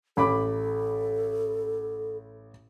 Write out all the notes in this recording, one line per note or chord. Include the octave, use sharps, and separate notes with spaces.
A1 A4 B5 D6